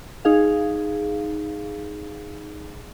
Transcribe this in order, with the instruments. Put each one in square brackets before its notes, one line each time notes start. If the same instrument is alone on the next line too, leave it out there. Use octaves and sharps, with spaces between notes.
[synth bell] D#4 G#4 F5